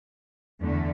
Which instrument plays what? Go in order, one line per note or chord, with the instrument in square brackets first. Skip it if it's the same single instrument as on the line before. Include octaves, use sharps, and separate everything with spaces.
[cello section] E2 D3 A3